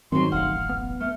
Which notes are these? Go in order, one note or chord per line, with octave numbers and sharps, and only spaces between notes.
G#2 C3 D#3 F#3 C4 C6
D#1 A1 F#2 F5 F#5 F6
B3
A3 F6